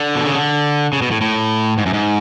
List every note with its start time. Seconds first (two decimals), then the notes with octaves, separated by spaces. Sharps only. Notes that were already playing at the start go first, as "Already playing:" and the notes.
Already playing: D3
0.15 B2
0.25 C#3
0.35 D3
0.93 C#3
1.02 B2
1.11 A2
1.21 A2
1.78 G#2
1.86 F#2
1.93 G#2